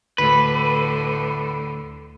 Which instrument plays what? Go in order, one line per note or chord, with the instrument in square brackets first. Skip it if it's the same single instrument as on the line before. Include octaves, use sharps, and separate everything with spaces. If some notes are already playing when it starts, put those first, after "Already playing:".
[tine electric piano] D2 B5 [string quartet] A2 D3 [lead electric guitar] B4